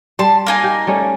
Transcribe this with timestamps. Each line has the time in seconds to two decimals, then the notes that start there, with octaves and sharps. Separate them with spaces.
0.19 G3 A5 C6
0.47 A#3 D#4 G#5
0.64 G4
0.87 G3 A3 C#4